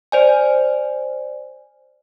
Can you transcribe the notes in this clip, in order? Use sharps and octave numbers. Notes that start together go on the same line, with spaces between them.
C5 D5 G#5